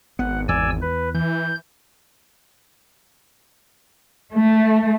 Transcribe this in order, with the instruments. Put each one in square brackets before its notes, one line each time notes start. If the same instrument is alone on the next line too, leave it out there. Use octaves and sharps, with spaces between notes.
[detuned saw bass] G#1 [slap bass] B3 [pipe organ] F#5
[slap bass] E2 [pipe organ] D5 G#5 E6
[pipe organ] B4
[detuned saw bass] E3 [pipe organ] G6
[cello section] A3